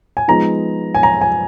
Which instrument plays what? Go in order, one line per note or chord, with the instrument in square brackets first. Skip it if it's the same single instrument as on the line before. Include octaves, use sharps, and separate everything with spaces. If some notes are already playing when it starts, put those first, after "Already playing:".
[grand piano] G#5
F3 G#3 B3 D#4 A#5
G#5
A#5
G#5